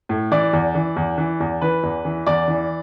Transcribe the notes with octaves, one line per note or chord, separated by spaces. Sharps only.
A2
E3 D5
E2
E3
E2
E3
E2
E3 B4
E2
E3
E2 D5
E3